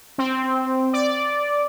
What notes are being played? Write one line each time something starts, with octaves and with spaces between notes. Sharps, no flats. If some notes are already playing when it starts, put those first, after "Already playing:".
C4
D5